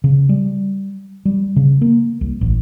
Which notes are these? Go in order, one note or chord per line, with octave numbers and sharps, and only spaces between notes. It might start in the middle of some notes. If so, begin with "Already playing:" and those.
C#3
G3
G3
C#3
A#3
C2
A1